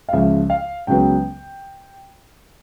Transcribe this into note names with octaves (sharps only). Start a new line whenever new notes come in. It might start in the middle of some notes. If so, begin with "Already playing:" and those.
F5
C#2 C#3 F3 E5
F5
C#2 C#3 F#3 B3 G5